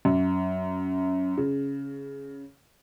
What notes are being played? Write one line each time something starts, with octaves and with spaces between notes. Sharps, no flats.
F#2
C#3